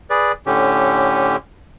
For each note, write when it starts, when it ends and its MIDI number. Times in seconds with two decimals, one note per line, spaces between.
0.10 0.32 68
0.10 0.32 71
0.10 0.32 74
0.46 1.36 45
0.46 1.36 50
0.46 1.36 61
0.46 1.36 67